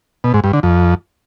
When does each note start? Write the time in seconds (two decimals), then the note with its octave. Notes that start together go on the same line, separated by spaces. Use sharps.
0.24 B2
0.34 G#2
0.44 G2
0.53 D3
0.63 F2